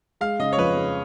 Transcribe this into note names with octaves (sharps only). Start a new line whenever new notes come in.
G#3 F5
C#3 D#5
C#5
F2 B4
C#3